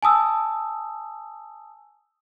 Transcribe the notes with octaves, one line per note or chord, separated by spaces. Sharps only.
G#5 A5 D#6 E6